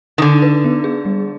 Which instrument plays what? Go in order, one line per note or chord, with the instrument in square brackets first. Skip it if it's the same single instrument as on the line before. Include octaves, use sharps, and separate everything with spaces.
[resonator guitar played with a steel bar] D#3
[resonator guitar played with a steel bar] D3 [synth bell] D#4
[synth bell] B4
B3
G#4
G3